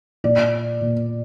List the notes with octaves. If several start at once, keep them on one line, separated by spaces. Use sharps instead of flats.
A#2 D5
A#2